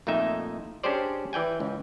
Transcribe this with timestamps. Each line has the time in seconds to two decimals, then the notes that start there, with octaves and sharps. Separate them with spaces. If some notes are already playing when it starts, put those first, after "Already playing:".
0.07 F2 A#2 A3 D#4 E5
0.84 C#4 D4 G4 G#4 C5 D5
1.33 E3 D5 G5 G#5
1.60 C#2